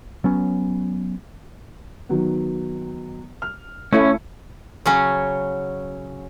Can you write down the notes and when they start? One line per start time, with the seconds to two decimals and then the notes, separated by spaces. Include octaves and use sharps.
0.24 F#3 B3 C#4
2.09 D#3 F#3 B3
3.42 F6
3.93 A3 C#4 E4
4.86 C#3 F#3 C#4